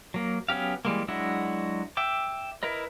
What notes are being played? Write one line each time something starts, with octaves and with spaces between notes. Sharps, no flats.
F#3 A#3
F#3 B3 C#4 G4 F5
E3 G3 G#3 A#3
F#3 G#3 D4 E4 F#4
E5 G5 D6
E4 A#4 B4 D#5